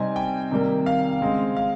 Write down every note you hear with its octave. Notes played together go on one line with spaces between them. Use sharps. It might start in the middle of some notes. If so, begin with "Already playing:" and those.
Already playing: C3 G3 C4 D#4 G#5
G5
C3 D#3 G3 A#3
F5
C#3 G#3 C4
F5